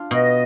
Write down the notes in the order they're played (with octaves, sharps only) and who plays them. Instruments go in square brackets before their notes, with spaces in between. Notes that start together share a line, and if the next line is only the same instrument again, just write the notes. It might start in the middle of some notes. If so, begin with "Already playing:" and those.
Already playing: [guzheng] D4 F4
[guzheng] B2 [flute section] D#5